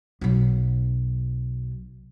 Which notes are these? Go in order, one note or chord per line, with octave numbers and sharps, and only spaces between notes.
B1 F#3